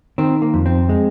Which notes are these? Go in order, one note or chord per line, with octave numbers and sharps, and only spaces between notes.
D#3 C4
A#3
F2
C4
G#3